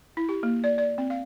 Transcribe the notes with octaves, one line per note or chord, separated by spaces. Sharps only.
E4
G4
A#3
D5
D5
C4
F5